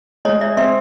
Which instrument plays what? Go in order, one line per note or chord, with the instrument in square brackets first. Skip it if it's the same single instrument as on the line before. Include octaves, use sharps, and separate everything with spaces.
[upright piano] G#3 [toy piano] C#5 D#5
[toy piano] D5 E5
[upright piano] C4 [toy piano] D5 E5